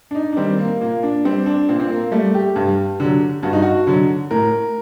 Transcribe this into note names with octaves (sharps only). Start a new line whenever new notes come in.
D4
D#4
D4
D#3 G3 C4
A#3
A#2 A#3
D4
G3 C4
D4
A#2 C4
C4
A#3
G3 A3
G4
G2
D3 F#3
G2 F#4
D#4
F#4
D3 F#3
A2 A#4